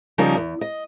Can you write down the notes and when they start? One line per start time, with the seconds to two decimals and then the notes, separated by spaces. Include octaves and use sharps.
0.18 C#3 F3 G3 C#4 D#4 A#4
0.37 E2
0.61 D#5